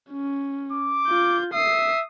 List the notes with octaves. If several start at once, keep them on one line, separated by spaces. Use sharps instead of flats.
C#4
D6
F4 G6
E5 D#6 C7